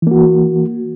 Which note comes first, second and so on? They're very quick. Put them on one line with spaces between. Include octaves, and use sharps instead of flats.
E3 A#3 F#4